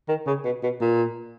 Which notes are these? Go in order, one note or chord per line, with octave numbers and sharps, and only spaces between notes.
D#3
C#3
B2
B2
A#2